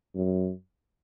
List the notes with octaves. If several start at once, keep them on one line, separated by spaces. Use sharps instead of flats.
F#2